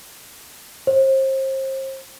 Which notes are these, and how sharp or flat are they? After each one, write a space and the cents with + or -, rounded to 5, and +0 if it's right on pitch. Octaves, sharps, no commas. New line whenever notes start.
C5 +35